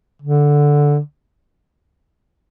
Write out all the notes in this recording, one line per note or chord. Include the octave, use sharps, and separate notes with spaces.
D3